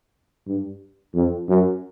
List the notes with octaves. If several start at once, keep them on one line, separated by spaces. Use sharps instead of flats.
G2
F2
F#2